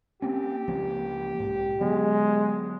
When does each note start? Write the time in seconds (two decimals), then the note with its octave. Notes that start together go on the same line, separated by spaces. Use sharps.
0.22 A#3 C4 C#4 G4
0.68 C#2 F3 A#3
1.39 B1 G#2
1.81 D3 F#3 G#3 B3